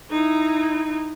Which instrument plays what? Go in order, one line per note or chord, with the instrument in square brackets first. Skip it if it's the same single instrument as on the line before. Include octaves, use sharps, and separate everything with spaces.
[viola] D#4 E4